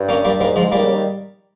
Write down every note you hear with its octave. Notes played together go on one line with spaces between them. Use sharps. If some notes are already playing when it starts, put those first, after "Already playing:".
Already playing: G2
A#3 C#4
G3 A#3
G#2 G3 A#3
F3 G#3
G#2
A#2 G3 A#3
D#3
C#3
D#3